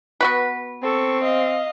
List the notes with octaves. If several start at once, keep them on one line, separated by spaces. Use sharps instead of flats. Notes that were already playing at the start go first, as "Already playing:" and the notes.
B3 F#4 B4
C4 A4 C#6
D#5 F5